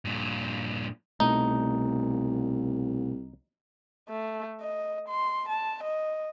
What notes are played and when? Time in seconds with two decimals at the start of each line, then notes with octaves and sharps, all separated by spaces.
0.05 G2 A#2
1.20 C2 B2 A3 D#4
4.09 A3
4.61 D#5
5.09 C6
5.49 A5
5.84 D#5